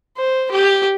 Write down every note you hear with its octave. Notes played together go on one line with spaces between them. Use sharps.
C5
G4